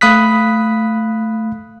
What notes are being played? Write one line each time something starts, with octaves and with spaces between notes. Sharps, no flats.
A3 F5 B5 D#6 F#6 B6